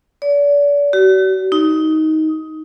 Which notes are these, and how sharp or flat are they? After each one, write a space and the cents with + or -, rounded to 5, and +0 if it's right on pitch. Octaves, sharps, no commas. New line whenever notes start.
D5 -40
F#4 +45
D#4 +15